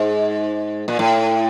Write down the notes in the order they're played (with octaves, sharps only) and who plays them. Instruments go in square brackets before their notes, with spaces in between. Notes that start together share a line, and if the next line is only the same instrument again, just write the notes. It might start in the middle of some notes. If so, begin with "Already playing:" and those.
Already playing: [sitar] G#2
A#2
A2